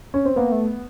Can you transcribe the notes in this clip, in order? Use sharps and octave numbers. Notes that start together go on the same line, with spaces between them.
C#4
C4
A#3 B3
A3